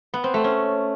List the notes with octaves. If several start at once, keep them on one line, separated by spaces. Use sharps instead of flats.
B3
C4
A3
C#4